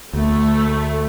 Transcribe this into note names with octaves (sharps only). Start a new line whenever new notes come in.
D2 A3